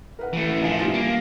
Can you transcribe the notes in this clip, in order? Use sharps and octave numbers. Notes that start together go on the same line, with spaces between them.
A#4 B4 F#5
E3 A3
F3 D4 E5 F5 G#5
G3 F4 A6
A#3